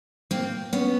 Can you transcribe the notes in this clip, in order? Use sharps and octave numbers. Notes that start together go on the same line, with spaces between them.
A#3 C4
B3 C#4